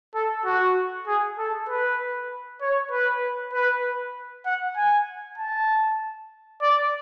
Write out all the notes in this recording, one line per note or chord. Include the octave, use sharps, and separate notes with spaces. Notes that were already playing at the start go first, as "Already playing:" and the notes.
A4
F#4
G#4
A4
B4
C#5
B4
B4
F#5
G#5
A5
D5